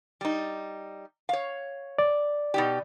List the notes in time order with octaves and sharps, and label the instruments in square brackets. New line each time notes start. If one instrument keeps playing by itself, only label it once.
[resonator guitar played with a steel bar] G3 D#4
C#5 F5
[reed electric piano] D5
[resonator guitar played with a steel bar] B2 D#4 G4